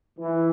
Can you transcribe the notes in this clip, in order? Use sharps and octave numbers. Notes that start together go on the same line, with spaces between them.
E3